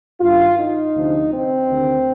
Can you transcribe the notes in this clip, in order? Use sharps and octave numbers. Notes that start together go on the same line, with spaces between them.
G2 D#3 F4
D#4
D2 C3 F3
C4
D2 C3 D#3